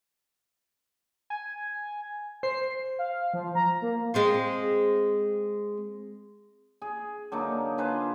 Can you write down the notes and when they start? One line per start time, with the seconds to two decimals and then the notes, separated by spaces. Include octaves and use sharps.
1.30 G#5
2.43 C5 C7
2.99 F5
3.34 F3
3.55 A#5
3.82 A#3
4.14 G#3 C4 F4
6.82 G#4
7.32 D3 F#3 A#3 D#4
7.78 F4 G#4 B4 C5